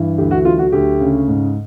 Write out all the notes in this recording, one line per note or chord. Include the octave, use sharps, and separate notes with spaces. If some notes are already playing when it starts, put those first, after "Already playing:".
Already playing: G2 E3
D2 G4
F#4
F#3 F4
F#4
D2 G4
C#3
G#2